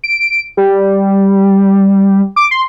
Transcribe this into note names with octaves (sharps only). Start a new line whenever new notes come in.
D7
G3
D6
C6